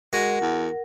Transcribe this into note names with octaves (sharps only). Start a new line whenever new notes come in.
G#3 F#4 A#4 F#5
E2